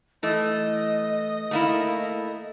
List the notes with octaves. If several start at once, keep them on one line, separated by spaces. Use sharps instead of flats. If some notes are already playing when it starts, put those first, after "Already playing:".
E3 A3 D#5
A3 A#3 E4